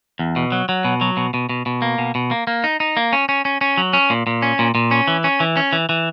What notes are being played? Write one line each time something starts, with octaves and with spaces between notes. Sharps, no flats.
E2
B2
F#3
F#3
B2
F#3
B2
B2
B2
B2
A#3
B2
B2
A#3
A#3
D#4
D#4
A#3
C#4
C#4
C#4
C#4
F#3
C#4
A#2
A#2
C#4
A#2
A#2
C#4
E3
C#4
E3
C#4
E3
E3